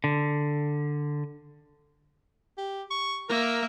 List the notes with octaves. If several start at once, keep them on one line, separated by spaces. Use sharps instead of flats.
D3
G4
C#6
A#3 A#4 E5